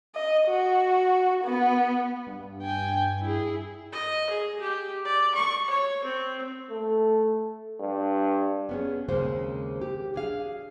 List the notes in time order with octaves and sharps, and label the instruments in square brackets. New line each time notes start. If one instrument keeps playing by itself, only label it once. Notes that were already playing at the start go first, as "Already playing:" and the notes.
[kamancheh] D#5
F#4
B3
[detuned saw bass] G2
[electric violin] G5 G#5
E4 G#4
[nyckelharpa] D#5
G#4
G4
D5
C#6
C#5
C4
[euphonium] A3
G2
[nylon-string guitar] B3 C#4 G#4
D#2 C#3 G#3 A#3 C4 C5
G4
D4 G#4 F5